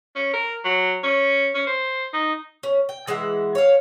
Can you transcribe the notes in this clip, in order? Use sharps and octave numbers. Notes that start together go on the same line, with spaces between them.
C#4
A#4
F#3
C#4
C#4
C5
D#4
C#4
G5
E3 G#3 E5 F#5
C#5 F5